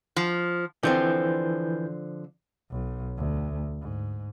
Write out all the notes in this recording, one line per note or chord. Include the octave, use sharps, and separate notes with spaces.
F3
D3 E3 F3 C4 G6
B1
D2
G#2